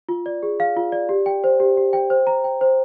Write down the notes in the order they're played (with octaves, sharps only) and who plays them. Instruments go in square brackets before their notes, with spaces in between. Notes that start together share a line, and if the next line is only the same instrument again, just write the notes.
[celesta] F4
D5
G#4
F5
F4
D5
G4
G5
C5
G4
G4
G5
C5
A#5
G5
C5